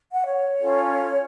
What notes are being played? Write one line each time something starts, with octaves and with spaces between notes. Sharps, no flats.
F#5
C#5
C#4 F4 A4